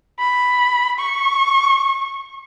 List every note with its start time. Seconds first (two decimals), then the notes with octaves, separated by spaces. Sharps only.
0.19 B5
0.99 C#6